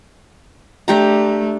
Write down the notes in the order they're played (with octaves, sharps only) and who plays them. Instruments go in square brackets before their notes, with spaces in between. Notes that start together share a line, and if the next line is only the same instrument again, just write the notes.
[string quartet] A3 [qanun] D4 G4 A#5